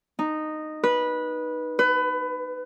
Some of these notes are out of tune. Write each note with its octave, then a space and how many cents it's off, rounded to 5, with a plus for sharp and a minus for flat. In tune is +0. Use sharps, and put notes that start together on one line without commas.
D#4 -10
B4 -15
B4 +25